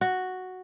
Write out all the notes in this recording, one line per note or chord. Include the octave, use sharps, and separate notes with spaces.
F#4